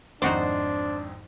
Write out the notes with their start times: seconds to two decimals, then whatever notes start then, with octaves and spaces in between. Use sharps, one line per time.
0.22 G#1 F2 G#2 D4 D#4 F#4 C5 D5